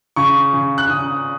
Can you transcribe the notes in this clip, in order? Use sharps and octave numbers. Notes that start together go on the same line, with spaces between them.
C#3 C#6
C#3
F#6
C#3 D#6